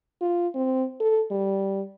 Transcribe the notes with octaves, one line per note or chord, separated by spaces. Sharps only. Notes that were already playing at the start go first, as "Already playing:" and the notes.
F4
C4
A4
G3